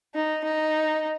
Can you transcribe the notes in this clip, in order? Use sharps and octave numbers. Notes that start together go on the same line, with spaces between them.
D#4
D#4